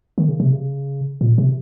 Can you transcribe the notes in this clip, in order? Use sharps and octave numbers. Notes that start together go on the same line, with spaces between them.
D#3
C#3
C3
C#3
A#2
C3